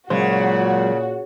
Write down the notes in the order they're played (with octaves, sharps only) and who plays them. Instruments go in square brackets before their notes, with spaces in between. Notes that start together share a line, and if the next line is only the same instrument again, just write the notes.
[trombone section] A#2 [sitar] C#3 [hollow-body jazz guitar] F#3 G#3 C5 [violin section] F#4